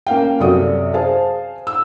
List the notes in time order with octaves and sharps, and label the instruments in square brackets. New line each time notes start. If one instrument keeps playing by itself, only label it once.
[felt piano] A#3 C#4 F5 G5
F#2 C3 F#4 A4 D5 D#6
G#4 C5 F5 A5
E6